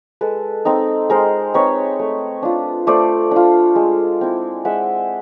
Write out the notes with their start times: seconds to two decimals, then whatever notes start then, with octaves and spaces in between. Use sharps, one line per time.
0.21 G#3 A4 B4
0.65 C4 D#4
1.10 G#3 A#4 C5
1.54 C4 D#4 B4 C#5
1.99 A3
2.43 D4 F4
2.87 A3 C5 D5
3.31 D4 F4
3.76 G#3
4.21 C4 E4
4.65 G#3 E5 F#5